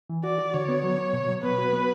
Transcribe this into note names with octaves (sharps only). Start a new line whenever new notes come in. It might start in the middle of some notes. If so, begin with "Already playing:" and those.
E3
F#4 D5
F#4
D3 C#5
B3
F#3
F#3
B2
F#3
B3 B4
F#4
B3